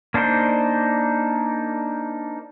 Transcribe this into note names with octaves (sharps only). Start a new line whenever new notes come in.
A#3 D4 D#4 C5